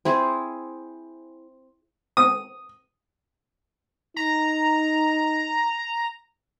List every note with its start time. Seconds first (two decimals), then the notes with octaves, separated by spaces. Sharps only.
0.05 C4 E4 G#4
2.17 D#6
4.16 D#4 A#5